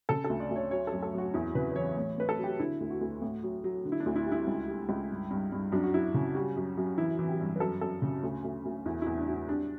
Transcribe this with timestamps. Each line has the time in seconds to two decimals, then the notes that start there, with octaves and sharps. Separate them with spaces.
0.09 C#3 A4
0.24 A4
0.30 D2
0.40 D5
0.50 D2
0.56 C#5
0.71 F#3 C#5
0.87 A4
0.92 F#2
1.02 A4
1.13 F#2 F#4
1.34 E2 E4
1.55 C#3 B4
1.72 B4
1.76 E3 C#5
1.97 A2 C#5
2.18 A2 B4
2.29 A4
2.39 F#3
2.44 G4
2.60 D3 E4
2.80 D2
2.90 F#4
3.01 D2
3.22 A2
3.43 F#3
3.64 F#3
3.85 D3
3.92 E4
4.00 D4
4.06 D2
4.16 E4
4.26 G3
4.32 E4
4.47 C#2
4.68 G3
4.89 C#2
5.11 G2
5.31 G2
5.52 G2
5.72 F#2 D4
5.83 F#4
5.94 F#2 E4
6.14 C#3
6.35 G3 F#4
6.56 F#2
6.77 F#2
6.98 E3 E4
7.19 E3
7.29 G4
7.40 G2
7.56 B4
7.60 F#2 A4
7.81 F#2 A4
8.02 C#3
8.23 D2
8.44 D2
8.65 D2
8.86 E2 E4
9.02 E2 E4
9.17 D4
9.28 F#3 E4
9.49 G3 D4